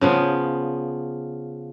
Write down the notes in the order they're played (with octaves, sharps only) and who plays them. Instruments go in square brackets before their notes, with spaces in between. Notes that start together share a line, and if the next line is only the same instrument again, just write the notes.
[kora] C#3 F3 B3